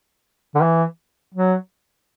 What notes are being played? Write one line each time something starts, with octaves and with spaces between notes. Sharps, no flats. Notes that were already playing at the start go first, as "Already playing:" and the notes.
D3
E3
F#3